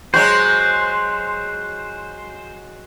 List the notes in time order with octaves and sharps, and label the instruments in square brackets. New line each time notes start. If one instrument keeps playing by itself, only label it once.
[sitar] F#3 G#3 F#4 [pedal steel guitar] C5